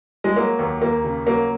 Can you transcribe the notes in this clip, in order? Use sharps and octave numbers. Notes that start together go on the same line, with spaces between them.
G#3
F#3 A#3
D#2
D#2 A#3
C#3
F#3 A#3